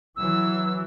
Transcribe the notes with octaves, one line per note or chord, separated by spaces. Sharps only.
E3 F#3 E6